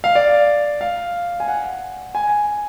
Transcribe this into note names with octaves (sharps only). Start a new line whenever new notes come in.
F5
D5
F5
G#5
F#5
G#5